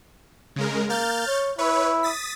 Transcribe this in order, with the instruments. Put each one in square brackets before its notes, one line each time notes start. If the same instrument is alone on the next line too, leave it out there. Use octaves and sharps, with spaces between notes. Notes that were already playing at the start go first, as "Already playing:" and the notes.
[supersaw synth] C#3 G#3 A#4
[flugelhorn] A#3 [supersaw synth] F6 G6 A6
[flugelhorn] C#5
[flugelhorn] E4 [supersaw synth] B4 C#5
[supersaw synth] D#6 A6 B6